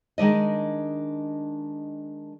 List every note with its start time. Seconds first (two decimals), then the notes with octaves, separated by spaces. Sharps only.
0.18 D#3 G#3 D4 D#5